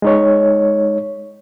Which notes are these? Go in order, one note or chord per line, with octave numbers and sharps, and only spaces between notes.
G#3 D#4 C#5